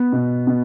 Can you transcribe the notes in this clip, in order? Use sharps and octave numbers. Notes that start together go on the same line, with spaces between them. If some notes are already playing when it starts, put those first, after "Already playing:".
Already playing: B3
B2
B2